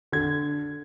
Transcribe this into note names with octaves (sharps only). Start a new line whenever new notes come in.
D3 G#6